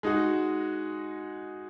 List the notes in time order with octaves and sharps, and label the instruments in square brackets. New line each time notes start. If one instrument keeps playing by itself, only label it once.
[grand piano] G#3 D#4 F#4